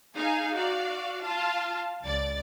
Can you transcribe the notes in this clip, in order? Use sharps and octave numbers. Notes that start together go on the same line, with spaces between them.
D#4 G#4 F5 G#5
F#4 D5 F5
F4 F5 A5
C#2 D5 A6